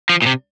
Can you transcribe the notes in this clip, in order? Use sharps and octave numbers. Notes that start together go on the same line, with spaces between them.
F3
A#2
C3